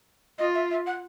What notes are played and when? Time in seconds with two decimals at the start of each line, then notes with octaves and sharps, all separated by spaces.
0.38 F4 D#5
0.54 E5
0.71 E5
0.87 F#5